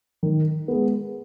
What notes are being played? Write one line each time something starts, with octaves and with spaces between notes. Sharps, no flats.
D#3
G#3 B3